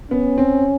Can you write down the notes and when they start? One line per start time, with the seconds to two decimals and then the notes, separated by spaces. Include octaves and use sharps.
0.11 B3 C#4
0.38 C4